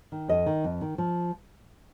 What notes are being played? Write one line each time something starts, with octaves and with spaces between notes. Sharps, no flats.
D#3
F2 D#5
D#3
F2
D#3
F3